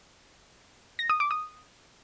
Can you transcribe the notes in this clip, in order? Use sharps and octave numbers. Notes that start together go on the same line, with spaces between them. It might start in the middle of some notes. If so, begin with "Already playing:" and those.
A#6
D#6
D6
D#6